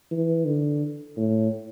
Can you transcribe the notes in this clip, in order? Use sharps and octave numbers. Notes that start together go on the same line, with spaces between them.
E3
D3
A2